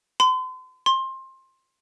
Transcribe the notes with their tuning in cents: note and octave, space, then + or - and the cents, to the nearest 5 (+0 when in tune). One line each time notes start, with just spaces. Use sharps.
C6 -40
C6 +20